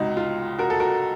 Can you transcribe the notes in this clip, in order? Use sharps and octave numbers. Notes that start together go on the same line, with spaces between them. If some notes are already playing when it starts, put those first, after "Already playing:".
Already playing: C#2 C3 D#4 F#4
F4
F#4 A#4
A4
F#4 A#4